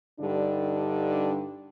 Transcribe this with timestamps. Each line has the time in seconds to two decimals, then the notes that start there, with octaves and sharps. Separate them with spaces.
0.20 G2 D3 G3 D4 D#4 G4